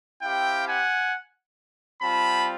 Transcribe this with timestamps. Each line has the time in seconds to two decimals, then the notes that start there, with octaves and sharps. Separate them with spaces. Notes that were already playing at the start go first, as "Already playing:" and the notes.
0.23 C4 E4 G4 F5 G5
0.67 F#5 G#5
2.01 G3 C4 F4 A5 B5